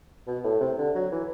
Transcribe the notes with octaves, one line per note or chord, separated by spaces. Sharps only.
B2
A2
C3
D3
F#3
E3